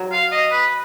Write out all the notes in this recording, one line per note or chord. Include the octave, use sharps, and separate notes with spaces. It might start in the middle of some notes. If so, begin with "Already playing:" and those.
Already playing: F#3
F5
D#5
B4